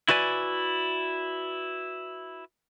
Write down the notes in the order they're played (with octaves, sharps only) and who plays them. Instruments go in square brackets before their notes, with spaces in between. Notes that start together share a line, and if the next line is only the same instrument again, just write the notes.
[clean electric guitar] E4 F#4 B4 D5 G#5